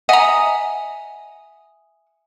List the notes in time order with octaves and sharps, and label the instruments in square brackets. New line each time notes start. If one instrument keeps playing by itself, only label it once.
[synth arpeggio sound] D#5 A#5 [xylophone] E5 G#5 D#6 [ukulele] F#5